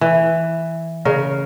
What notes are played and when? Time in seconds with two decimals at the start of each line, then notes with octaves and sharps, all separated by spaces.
0.01 E3
1.05 C#3 A#4